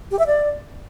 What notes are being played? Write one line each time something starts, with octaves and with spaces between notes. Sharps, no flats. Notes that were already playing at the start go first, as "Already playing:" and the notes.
G4
E5
D5